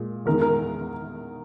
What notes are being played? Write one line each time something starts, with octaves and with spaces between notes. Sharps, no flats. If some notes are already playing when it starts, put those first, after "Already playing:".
Already playing: A#2 G#3
E2 D#3 G#3 A#4
A#4